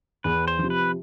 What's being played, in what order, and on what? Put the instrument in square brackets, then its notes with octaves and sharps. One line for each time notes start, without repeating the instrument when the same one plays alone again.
[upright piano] E2 [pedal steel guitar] B4
[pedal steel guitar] C5
[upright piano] C3 F3
[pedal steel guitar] B4